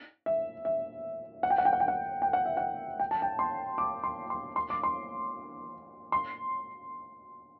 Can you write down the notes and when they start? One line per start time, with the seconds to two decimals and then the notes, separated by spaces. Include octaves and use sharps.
0.26 E5
0.65 E5
1.43 F#5
1.50 G5
1.58 F#5
1.65 G5
1.73 F#5
1.80 G5
1.88 F#5
2.22 G5
2.33 F#5
2.46 E5
2.57 F#5
3.00 G5
3.11 A5
3.22 G5
3.39 C6
3.78 D6
4.04 C6
4.30 C6
4.56 C6
4.70 D6
4.83 C6
6.12 C6